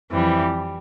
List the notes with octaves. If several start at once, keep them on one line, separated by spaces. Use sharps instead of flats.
F2 E3 G3